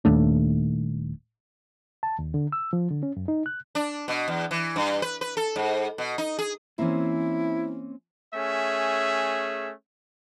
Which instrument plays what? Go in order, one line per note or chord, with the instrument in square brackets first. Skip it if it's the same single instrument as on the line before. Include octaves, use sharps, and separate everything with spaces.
[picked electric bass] D#1 D#2 A3 D4
[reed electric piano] A5
D#2
D3
E6
F3
D3
C#4
F#2
D#4
F#6
[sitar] D4
B2
E2
E3
G2
B4
B4
A4
G#2
B2
D#4
G#4
[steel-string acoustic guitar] E3 C5 [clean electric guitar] A#3 C4 C#4 [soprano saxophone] E4
[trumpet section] A3 C#4 G#4 E5